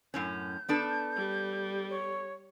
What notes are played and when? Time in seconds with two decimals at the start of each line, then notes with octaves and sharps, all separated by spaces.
0.14 F#2 A2 C#4 G6
0.69 B3 D4 A4
1.16 G3
1.90 C#5